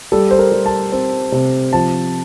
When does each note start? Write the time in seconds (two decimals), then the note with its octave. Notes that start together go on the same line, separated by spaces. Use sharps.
0.12 G3 A4
0.31 C5
0.39 A#4
0.52 G3
0.66 A5
0.92 C4
1.32 C3
1.73 F3 A5